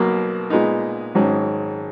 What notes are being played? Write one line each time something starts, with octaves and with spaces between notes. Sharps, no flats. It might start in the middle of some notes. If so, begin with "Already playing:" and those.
Already playing: B1 B2 A#3
A#2 G#3 B3 D#4
G#1 G#2 F#3 C#4